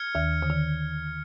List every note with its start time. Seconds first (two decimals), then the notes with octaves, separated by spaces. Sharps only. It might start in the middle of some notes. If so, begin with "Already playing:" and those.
Already playing: F6 G#6 C#7
0.15 D#2 D#3
0.42 D3
0.50 D#3